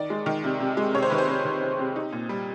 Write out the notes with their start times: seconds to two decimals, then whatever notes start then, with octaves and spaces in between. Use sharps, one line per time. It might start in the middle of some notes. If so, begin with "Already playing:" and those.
Already playing: D#3 D5
0.10 G#3
0.26 D#3
0.44 C3
0.60 C3
0.77 G#3
0.94 C3 C#5
1.02 C5
1.10 D#3 B4
1.18 C5
1.29 C3
1.45 D#3
1.62 C3
1.79 C3
1.96 D#4
2.12 A#2
2.29 G3